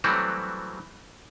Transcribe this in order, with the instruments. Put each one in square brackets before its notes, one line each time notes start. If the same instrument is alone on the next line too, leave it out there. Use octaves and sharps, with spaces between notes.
[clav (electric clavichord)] E3 F#3 G3 A3 C4 F#4